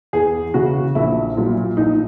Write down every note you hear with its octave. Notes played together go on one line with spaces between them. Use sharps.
E2 G#4
C#3 E3 F#4
A#1 E4
A#2 F#3
A#1 D#4